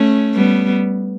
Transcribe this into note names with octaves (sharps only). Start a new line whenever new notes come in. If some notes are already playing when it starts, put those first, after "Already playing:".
Already playing: A3 C#4
G3 B3